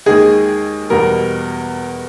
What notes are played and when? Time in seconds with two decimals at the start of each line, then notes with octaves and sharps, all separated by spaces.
0.06 D#2 D#3 G#3 G#4
0.90 E2 B2 G3 A#4